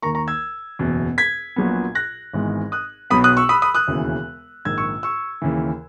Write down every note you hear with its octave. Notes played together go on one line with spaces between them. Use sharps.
D#2 D#3 A#3 A#5 C#6
A#5 C#6
E6 G#6
F#1 E2 B2
G#6 B6
A#1 A#2 F#3 B3
F#6 A#6
G#1 G#2 E3 G#3 B3
D#6 F#6
B1 B2 F#3 B3 B5 D#6
D#6 F#6
C#6 E6
B5 D#6
B5 D#6
D#6 F#6
E1 D#2 C#3 E3
A#1 G#2 D#3 E6 G#6
C#6 E6
C#6 E6
D#2 C#3 E3